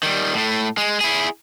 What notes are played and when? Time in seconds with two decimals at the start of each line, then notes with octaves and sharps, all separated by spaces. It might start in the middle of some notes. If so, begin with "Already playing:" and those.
0.03 D#3 G3
0.34 A2 A3
0.77 G#3
1.01 E4 G#4